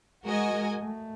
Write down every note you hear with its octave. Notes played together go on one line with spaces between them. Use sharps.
G#3 F#4 A#4 D#5 G#5
G#3
A3